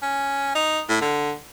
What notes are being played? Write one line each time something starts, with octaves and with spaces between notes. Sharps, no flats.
C#4
D#4
A2
D3